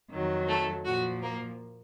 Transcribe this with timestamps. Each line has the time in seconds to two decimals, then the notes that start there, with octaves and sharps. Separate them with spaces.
0.11 F2 D#3 F#3
0.48 A3 A4
0.85 A#2 F3 F#4
1.22 A#3 A#4